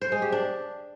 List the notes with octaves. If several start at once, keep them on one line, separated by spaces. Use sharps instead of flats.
C5
G#3
G4
D4